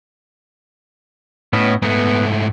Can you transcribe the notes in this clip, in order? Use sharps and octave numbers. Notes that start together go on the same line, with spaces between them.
A2 B3 C#4 D#5
G#2 A3 B3